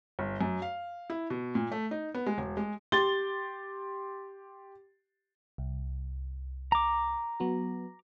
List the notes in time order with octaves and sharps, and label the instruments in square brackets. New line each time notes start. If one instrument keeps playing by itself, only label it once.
[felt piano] G1
F#2
F5
E4
B2
A#2
A3
D#4
B3
G#3
E1
G#3
[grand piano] G4 C6 A6 G7
[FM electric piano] C2
[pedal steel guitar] A#5 D6
[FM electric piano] F#3 B3 F#4